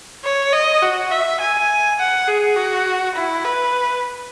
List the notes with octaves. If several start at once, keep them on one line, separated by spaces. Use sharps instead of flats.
C#5
D#5
F#4
E5
G#5
F#5
G#4
F#4
E4
B4